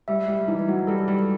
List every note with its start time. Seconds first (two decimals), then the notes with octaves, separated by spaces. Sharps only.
0.08 G3 E5
0.28 G3
0.48 E3 D#4
0.68 F#3
0.87 G3 A4
1.08 G3